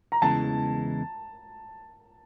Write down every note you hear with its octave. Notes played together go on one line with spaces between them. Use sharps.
A#5
E2 C#3 E3 G#3 A5